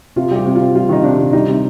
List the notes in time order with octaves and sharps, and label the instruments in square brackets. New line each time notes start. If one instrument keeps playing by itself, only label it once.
[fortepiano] C3 F4
G3 G4
C3
F4
C3
G3 F4
D#3 D#4
C3 D4
C3
G3 D#4
C3